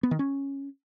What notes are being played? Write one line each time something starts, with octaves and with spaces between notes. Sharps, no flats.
B3
D#3
C#4